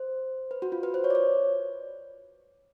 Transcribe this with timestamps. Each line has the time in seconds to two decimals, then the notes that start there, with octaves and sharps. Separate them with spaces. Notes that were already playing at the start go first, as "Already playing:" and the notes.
Already playing: C5
0.51 B4
0.62 F#4
0.72 F4
0.83 B4
0.94 C5
1.04 C#5
1.10 D5
1.15 C#5